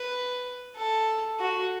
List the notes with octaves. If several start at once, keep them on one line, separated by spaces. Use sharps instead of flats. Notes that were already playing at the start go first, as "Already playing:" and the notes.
Already playing: B4
A4
F#4